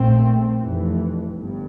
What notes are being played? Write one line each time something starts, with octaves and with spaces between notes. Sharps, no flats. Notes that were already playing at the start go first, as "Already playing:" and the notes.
Already playing: A#1 A#2 A3 C4
F1 F2 E3
G1 G2